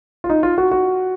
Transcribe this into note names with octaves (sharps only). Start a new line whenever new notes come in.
F4
D#4
F4
F#4
F#4